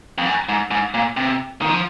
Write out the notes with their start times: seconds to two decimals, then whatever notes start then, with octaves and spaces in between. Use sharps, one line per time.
0.18 F2
0.26 F#2
0.49 G#2
0.71 G#2
0.94 A#2
1.17 C3
1.62 D#3
1.69 F3